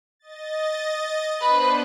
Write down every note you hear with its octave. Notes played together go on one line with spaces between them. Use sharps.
D#5 A6
B3 D4 B4 C5